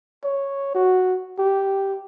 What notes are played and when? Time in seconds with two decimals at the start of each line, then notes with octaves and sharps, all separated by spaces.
0.24 C#5
0.74 F#4
1.38 G4